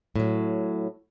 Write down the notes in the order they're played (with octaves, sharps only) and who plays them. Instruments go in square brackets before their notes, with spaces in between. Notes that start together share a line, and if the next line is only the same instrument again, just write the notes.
[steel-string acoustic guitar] A2 F#3